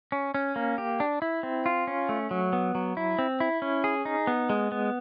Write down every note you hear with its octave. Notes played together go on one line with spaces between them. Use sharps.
C#4
C#4
A#3
G4
D4
E4
C4
F4
C#4
A3
F#3
B3
F#3
E4
C4
E4
C#4
G#4
D#4
B3
G#3
B3